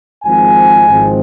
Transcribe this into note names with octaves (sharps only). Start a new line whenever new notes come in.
G#1 G#2 F3 G#3 C4 G#5
G#1 G#2 F3 G#3 C4